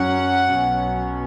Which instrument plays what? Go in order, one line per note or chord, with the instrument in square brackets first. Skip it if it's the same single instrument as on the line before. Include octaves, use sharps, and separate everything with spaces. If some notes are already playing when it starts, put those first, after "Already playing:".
Already playing: [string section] F#2 F#3 C#4 F#5
B1 B2 F#3 C#4